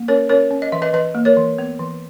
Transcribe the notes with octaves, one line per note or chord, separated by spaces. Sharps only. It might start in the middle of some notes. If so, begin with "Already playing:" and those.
Already playing: A#3
C#4 A#4 C#5
C#4 A#4 C#5
C#4
D#5
E3 E5
B4 D#5
E3 B4 D#5
A#3
A#4 C#5
E3
B3
E3